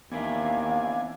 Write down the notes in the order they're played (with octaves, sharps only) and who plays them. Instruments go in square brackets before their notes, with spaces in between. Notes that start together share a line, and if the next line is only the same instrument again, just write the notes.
[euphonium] D#2 [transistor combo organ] E3 D4 G#5 [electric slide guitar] B3 C4 E5 [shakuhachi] F5